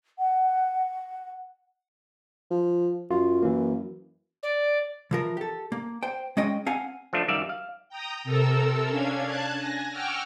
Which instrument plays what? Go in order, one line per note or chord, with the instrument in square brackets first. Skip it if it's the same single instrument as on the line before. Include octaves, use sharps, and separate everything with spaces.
[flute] F#5
[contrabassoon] F3
[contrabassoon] F#2 [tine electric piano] F4
[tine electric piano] E3 A#3
[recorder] D5
[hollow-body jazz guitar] E3 F3 A#4
G4 A4
A#3
C5 G5
G#3 C#4 D#5 G5
C4 F5 F#5 G#5
[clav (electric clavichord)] F3 A3 D4
F#2 D#3 G3 D5 E5 F5
F5
[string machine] G5 A#5 D#6
C3 A4 A#4 E6
C#4 D4 F5 G#6
A5 F#6 G#6
G#5 A#6
F#5 G5 C#6 D6 E6 F6